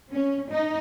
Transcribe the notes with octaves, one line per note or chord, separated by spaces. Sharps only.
C#4
D#4